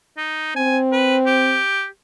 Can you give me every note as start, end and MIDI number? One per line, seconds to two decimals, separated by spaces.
0.17 0.52 63
0.56 1.60 60
0.56 0.78 80
0.92 1.17 71
1.27 1.86 67